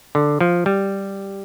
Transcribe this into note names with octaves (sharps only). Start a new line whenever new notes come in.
D3
F3
G3